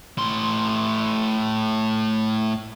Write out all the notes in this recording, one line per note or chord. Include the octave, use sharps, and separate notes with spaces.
A2 C6